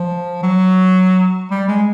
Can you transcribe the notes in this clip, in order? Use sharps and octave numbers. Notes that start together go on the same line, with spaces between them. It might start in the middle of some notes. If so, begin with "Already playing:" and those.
Already playing: F3
F#3
G3
G#3